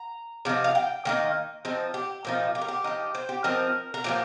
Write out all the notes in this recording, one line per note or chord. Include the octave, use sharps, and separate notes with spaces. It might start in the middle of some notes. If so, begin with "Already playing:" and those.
Already playing: A#5
C3 F3 D#4
F5
G5
D#3 A#3 D#4
F3 C4 D#4
G4
A#2 F3 D#4
G4
A#4
G4
F3 D#4
C5
G4
F3 C4 D#4 A#4
A#4
A#2 F3 A#3 G4